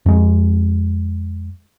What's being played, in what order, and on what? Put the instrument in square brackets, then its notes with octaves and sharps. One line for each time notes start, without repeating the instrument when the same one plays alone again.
[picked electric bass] F2 G#3